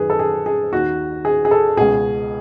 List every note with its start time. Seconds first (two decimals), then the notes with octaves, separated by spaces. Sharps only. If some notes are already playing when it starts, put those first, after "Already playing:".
Already playing: F#2 D#3 G#4 B4
0.10 A4
0.19 G#4
0.46 G#4
0.72 D#2 D#3 F#4
1.25 G#4
1.45 G#4
1.51 A4
1.77 C#2 B2 G#4